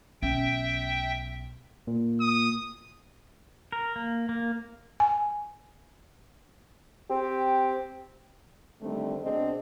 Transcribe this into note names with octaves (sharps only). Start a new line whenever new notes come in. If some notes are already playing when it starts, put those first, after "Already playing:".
B1 C#4 E5 G5
A#2
D#6
A#4
A#3
A#3
G#5
C4 G4
D3 D#3 G3 A3 C4 D4
B2 C4 D4 G#4 D#5